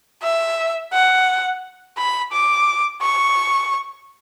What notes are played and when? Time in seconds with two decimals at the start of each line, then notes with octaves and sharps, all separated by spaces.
0.23 E5
0.93 F#5
1.98 B5
2.33 D6
3.02 C#6